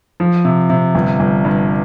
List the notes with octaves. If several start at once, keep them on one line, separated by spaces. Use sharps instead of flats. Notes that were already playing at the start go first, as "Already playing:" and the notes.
F3
C3
C3
G1
G1
G2